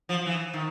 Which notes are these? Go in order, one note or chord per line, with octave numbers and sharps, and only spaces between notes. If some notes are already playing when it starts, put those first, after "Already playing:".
F3
E3
D#3